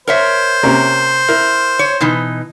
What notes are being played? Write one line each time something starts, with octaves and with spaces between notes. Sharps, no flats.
A#4 C5 C#5 E5
C3 A#3 C#4
E4 A#4
C#5
B2 E3 D#4